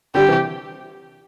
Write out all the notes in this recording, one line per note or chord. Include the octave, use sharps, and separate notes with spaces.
D3 G3 G4
C3 E3